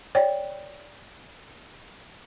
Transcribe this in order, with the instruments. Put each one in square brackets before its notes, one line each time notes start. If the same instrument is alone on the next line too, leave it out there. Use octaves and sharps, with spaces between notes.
[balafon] C#5 D5 G5